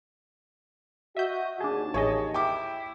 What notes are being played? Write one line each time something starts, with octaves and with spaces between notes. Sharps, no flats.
F#4 D#5 E5 G6
D#2 D4 G#4 A5
A1 G#4 C#5 D#5
E4 G5 D6